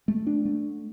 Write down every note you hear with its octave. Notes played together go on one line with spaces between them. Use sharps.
A3
D4
A3